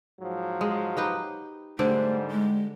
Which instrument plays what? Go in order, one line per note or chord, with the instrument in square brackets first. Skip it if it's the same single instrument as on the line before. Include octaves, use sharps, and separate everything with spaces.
[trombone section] G#2 F3 F#3
[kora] G#3
D#4 G4 B4
[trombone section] G#2 G3 [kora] D3 D4 D5 [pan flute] A3 [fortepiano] C5
[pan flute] G#3